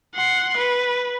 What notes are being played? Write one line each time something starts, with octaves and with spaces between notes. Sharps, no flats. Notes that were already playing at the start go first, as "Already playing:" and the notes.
F#5 C6
B4